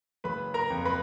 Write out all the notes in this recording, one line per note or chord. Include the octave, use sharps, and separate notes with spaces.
F#1 B4 B5
A#4 A#5
F2
B4 B5